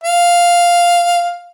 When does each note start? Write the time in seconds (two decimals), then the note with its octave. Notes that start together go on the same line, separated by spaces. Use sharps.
0.04 F5